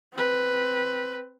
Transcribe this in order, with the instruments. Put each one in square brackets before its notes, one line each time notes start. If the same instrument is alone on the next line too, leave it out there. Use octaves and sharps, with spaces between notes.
[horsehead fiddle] C4 B4